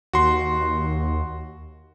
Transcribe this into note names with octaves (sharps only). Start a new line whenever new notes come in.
D#2 F#4 C6